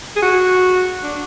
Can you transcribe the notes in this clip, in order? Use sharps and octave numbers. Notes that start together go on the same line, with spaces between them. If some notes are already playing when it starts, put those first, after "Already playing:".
G#4
F#4
D4